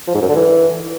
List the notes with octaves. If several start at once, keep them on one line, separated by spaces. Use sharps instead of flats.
F3
G#2
F#2
D3
E3